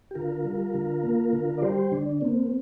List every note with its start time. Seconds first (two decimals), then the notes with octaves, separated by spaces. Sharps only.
0.11 G4
0.15 D3 F4 A#4
0.45 G3
0.74 D3
1.03 A#3
1.33 D3
1.58 D5
1.62 G3 G4 C5
1.91 D3 D4
2.21 A#3 C4